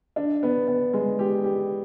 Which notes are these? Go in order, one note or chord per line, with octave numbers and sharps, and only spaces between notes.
D4
B3
B3
G#3
G4
G4